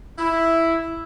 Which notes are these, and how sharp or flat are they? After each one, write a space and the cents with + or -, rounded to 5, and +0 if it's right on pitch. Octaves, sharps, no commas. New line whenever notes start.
E4 +0